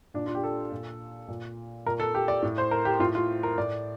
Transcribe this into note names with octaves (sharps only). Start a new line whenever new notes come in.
A#2 D4
F4
G4
A4
A#2
A#2
A#2 A#4
A4
G4
D5
A2
C5
A#4
G4
A2 F4
F4
A#4
A2 D5